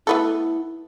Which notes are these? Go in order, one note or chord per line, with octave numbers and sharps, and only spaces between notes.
A3 B3 E4 A4